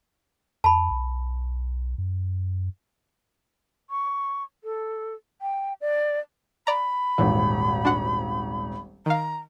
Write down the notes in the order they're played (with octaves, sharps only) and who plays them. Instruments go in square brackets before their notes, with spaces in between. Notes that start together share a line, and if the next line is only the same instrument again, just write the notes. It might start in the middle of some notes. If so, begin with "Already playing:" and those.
[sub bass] F2 [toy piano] A5 B5
[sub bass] B1
F#2
[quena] C#6
A4
G5
D5
[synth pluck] D5 A#5 [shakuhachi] B5
[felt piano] D#1 G#1 [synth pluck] E3
[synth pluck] D4 F#4 F#5
[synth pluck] D#3 F5 [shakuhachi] A#5